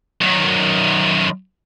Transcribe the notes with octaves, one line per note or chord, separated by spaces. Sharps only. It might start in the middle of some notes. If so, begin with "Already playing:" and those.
F#2 D#3